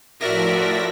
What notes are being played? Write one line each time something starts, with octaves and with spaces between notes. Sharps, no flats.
A2 F3 F#4 A#4 D5 E5 A#6 B6